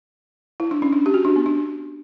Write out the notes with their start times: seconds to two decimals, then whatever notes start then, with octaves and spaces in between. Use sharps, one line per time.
0.60 E4
0.71 D4
0.82 C#4
0.93 D4
1.06 G4
1.14 F#4
1.25 D4
1.36 B3
1.46 D4